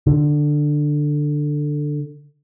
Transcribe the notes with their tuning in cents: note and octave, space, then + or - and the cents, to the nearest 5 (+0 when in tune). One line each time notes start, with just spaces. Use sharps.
D3 +10